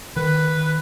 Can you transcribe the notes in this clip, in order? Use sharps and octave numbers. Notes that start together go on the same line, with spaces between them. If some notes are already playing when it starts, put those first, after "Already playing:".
D#3 B4